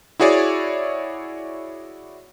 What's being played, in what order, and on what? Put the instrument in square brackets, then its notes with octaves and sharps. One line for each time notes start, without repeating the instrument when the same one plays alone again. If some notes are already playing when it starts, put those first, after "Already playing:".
[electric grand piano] E4 F#4 G#4 C#5 D5